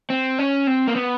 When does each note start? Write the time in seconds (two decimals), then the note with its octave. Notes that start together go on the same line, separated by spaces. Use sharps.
0.10 C4
0.39 C#4
0.67 C4
0.88 A#3
0.96 B3